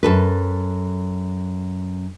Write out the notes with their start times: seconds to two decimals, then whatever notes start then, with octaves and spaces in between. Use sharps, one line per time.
0.03 F#2 A4 B4